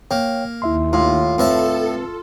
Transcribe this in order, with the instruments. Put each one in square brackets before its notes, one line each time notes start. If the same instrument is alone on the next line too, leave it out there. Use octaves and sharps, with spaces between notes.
[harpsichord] A#3 [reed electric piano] C#5 F5 G5
[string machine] D#2 [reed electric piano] E4 E5 C6
[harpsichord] A2 [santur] F4
[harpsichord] A2 E5 A5 [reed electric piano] C4 B4 [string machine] A4